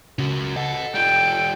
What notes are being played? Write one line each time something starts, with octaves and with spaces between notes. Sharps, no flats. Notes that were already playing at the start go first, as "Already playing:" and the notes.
C#2 C#4 F#4
A4 D#5 F#5
G3 F4 G5